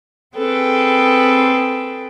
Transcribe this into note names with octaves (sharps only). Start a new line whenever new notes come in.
C4 G#4 A4 B4 G5